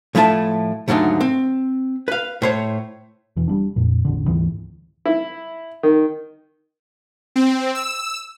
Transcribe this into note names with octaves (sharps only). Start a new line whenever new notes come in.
A2 F3 A3 E4 G#5 A5
D#2 G#2 D3 F#3 A3 D#4
C4
B4 F5
A2 C5 C#5
E1 E3
G3 A#3 D4
F2 A#2
E1 A1 D3
D2 G#2 E3
E4
D#3
C4
E6